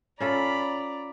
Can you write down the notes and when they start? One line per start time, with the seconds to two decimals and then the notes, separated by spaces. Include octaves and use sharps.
0.20 C#4 F4 A4 D5 A#5 B5